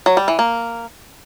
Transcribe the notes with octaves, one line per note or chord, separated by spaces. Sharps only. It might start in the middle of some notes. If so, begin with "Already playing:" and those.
F#3
G3
E3
A#3